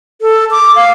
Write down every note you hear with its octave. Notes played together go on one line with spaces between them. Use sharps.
A4
D6
F5